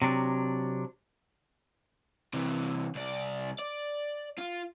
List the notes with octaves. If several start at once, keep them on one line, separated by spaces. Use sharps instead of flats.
C3 F#3 D4
C3 E3
C2 D5
D5
F4